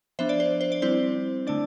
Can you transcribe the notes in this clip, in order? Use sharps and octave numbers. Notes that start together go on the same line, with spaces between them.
F3 B3 D4 C5 E5
D5
C5
C5
D5
G3 C4 E4 C5
D3 A3 D4 D5